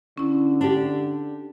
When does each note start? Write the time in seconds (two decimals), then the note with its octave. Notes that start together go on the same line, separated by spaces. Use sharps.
0.18 D3 C#4 E4
0.61 D4 G4